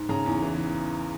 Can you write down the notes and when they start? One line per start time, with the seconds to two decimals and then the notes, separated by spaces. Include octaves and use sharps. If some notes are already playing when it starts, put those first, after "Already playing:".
Already playing: G#2
0.09 C#3 A#5
0.26 E2
0.43 E3